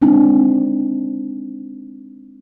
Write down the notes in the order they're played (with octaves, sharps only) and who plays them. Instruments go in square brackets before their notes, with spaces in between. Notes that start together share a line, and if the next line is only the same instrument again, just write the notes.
[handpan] G#3 C4 D4 D#4